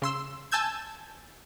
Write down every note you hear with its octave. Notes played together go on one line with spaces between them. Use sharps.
C#3 C6 E6
G#5 A5 E6 G6 G#6